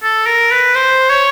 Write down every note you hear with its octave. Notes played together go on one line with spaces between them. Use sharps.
A4
A#4
B4
C5
C#5